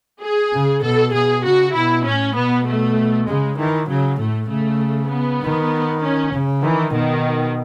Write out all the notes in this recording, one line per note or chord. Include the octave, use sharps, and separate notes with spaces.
G#4
C#3
B2 A4
B2 G#4
C#3 F#4
B2 E4
A2 C#4
B2 B3
A3
C#3 G#3
D#3 E3
C#3 F#3
A2 A3
C#3 A3
B3
D#3
C#4
C#3
D#3 E3
B2 D#3